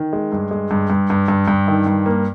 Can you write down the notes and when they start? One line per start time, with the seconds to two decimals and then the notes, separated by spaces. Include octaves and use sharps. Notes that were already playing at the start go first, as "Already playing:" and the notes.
Already playing: D#3
0.13 G#3
0.32 G2
0.51 G#3
0.71 G2
0.90 G2
1.10 G2
1.28 G2
1.48 G2
1.68 D#3
1.86 G2
2.06 A#3